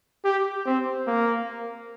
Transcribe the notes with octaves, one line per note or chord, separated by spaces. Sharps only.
G4
C4
A#3